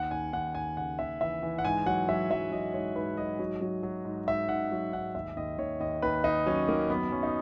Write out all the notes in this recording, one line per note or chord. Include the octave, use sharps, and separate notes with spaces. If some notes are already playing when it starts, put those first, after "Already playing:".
Already playing: D#2 F#5
D#2 G#5
D#2 F#5
D#2 G#5
C#3 F#5
D#2 E5
E3 E5
E3
F#5
G#2 G#5
F#3 F#5
F#3 E5
F#3 E5
F#3 D#5
G#2 C#5
G#2 B4
F#3 D#5
F#3
F#3
F#3
G#2
G#2 E5
G#2 F#5
F#3
G#2 F#5
D#2 E5
D#2 D#5
D#2 C#5
D#2 D#5
D#2 B4
D#2 D#4
F#3 C#4
D#3 A#3
F#2 B3
F#2 C#4
D#4